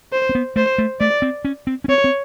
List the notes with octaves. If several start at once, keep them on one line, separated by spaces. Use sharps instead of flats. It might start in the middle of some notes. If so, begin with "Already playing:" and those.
C5
C4
B3
A3 C5
A3
A3 D5
C4
C#4
C4
C#4
C4 C#5
C4